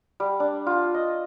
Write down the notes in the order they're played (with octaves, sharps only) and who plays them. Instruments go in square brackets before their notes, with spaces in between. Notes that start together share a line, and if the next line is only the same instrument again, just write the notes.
[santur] G3
D4
F4
D#5